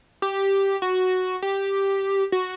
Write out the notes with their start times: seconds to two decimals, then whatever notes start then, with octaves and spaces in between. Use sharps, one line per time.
0.22 G4
0.82 F#4
1.42 G4
2.32 F#4